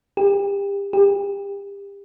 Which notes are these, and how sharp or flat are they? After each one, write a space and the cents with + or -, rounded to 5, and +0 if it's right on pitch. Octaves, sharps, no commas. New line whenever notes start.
G4 +30
G4 +30